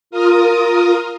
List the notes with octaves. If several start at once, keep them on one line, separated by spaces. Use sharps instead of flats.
F4 A#4 D#6